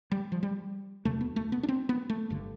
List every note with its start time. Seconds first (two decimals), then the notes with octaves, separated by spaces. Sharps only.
0.12 G3
0.32 F3
0.43 G3
1.05 E1 D2 C3 A3
1.21 B3
1.36 A3
1.52 B3
1.63 D4
1.68 C4
1.89 B3
2.10 A3
2.30 G1 G2 D3